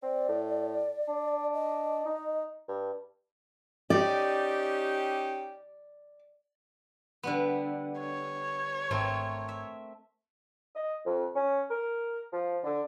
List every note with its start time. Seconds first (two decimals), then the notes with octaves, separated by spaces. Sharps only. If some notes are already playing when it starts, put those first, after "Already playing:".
0.03 C4 D5
0.29 A2
1.08 D4
1.53 D#5
2.06 D#4
2.68 G2
3.90 C#4 D#4 G4 D5
7.23 D3 G3 B3
8.00 C#5
8.91 G#1 A3 C4 A#4
9.49 E5
10.75 D#5
11.05 F2
11.35 C#4
11.70 A#4
12.32 F3
12.64 D3